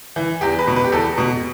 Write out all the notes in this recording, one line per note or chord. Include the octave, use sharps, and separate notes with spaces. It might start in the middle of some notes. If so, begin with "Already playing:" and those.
E3
E2 G4
B4
B2
B4
G4
E2 A4
B2